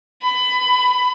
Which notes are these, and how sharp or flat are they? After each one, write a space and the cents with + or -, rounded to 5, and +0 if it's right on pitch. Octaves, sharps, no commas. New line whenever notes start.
B5 +20